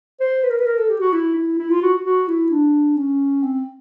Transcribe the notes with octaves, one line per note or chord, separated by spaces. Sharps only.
C5
B4
A#4
B4
A#4
A4
G4
F#4
E4
E4
E4
F4
F#4
F#4
E4
D4
C#4
C4